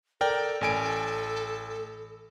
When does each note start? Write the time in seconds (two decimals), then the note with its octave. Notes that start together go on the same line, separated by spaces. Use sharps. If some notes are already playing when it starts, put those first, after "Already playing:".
0.21 A4 A#4 D5 G5
0.61 A1 A4 G#5 D7